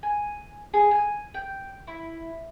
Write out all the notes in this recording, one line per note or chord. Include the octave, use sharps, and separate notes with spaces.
G#5
G#4
G#5
G5
E4